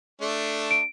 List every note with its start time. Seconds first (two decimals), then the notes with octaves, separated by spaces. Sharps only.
0.22 A3 D4
0.71 D7